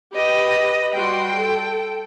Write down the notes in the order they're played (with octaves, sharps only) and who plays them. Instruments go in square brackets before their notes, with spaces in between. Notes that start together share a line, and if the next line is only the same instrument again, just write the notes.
[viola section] G4 [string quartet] B4 D#5
[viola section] G3 F#4 C6 [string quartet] G5
[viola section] A4